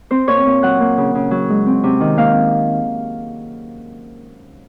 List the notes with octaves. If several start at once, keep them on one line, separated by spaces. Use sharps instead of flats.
C4 C5
A#2 C#5
A#2
F#3 F#5
A#3
C#3
C#3
F#3
G#3
C4
C3
D#3
A#3 F5